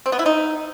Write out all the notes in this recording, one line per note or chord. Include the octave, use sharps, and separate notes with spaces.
C4
B3
E4
D#4